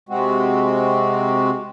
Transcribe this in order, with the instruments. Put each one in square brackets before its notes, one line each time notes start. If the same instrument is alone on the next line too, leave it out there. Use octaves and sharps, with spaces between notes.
[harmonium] C3 G#3 C4 F#4